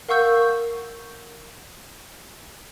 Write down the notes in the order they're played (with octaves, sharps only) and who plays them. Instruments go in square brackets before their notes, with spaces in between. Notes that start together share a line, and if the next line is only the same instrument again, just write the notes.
[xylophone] A#4 F5 F#5 C#6 E6 G6